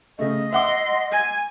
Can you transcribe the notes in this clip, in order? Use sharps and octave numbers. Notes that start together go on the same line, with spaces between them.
C#3 A3 D#5
E5 F#5 C6 D6
G#5